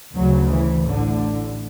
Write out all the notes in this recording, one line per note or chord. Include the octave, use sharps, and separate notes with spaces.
D2 C#3 F#3
E3
A1 A2 D3